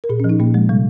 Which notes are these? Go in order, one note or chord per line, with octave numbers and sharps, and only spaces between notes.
A#4
A#2 G#4
C#4
F3
D#4
A#2 A#3
F3 G#3
C3 G3